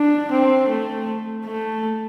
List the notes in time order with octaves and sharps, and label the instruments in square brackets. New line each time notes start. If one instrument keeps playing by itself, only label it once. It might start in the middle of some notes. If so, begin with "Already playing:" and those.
Already playing: [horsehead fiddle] D4
C4
A3
A3